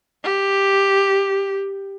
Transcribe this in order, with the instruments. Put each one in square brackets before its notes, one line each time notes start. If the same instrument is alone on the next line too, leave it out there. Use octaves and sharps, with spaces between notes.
[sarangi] G4